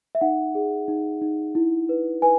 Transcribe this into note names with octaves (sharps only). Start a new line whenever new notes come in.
E5
D#4 F#5
G#4
D#4
D#4
E4
B4
B4 G#5